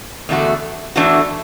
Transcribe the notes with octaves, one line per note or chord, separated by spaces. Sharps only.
E2 D3 A3 F#4
E2 E3 A3 D4 F#4